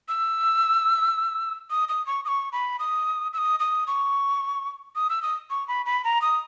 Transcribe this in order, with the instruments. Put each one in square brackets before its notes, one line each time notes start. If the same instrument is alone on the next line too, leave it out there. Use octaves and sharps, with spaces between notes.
[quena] E6
D#6
D#6
C#6
D#6
C#6
B5
D#6
E6
D#6
D#6
C#6
D#6
E6
D#6
C#6
B5
B5
A#5
D#6